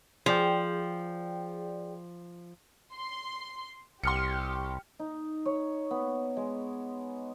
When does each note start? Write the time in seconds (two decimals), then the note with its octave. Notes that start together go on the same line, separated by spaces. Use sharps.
0.26 F3 G#4 D5 G5
2.94 C6
4.04 C2 G4 C6 F6 C#7
4.99 D#4
5.45 C#5
5.91 B3
6.37 G#3